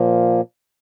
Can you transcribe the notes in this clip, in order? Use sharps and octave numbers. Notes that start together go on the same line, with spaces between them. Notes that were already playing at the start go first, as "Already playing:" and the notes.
Already playing: A#2 F3 A#3